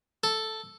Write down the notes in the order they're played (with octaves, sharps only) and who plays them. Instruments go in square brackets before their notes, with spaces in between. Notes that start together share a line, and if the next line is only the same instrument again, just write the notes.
[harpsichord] A4